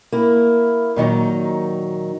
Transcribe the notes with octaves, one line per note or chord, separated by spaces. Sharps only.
A#3 E4
A#2 D#3 F#3 D#4